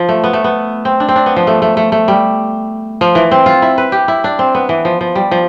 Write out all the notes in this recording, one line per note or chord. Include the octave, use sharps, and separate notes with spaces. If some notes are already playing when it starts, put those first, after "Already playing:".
Already playing: F3
A3
B3
A3
B3
C4
D4
C4
D4
B3
F3
A3
A3
A3
A3
G3
F3
E3
C4
F4
E4
B4
G4
E4
D4
C4
B3
E3
F3
F3
G3
F3